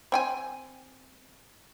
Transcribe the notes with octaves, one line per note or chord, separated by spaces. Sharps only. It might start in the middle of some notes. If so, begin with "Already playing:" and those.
C4 G5 G#5